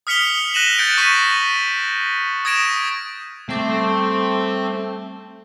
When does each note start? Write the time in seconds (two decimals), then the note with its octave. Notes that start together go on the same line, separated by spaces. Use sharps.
0.07 D#6 F6 B6 C#7 F7 G7
0.54 F#6 A#6 D#7 E7 F#7
0.78 F#6 G6 A6 C#7 D7
0.98 C#6 B6 D#7
2.45 D#6 G#6 A#6 D7 E7
3.49 G3 A3 C4 A4 D6